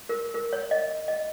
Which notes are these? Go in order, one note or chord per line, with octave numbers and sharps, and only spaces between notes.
A#4
A#4
C#5
D#5
D#5